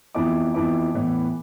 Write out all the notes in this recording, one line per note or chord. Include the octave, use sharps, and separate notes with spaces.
F2 E3 B3 E4 D6
F2 E3 B3 E4 D6
A2 E3 B3 E4